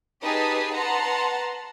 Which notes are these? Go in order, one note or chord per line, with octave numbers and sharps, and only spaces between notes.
D#4 G4 G#4 B4 A5 D#6
B4 F#5 A5 A#5 C6